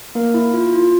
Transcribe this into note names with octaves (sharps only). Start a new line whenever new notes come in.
A#3 A#4
E4
F4
F4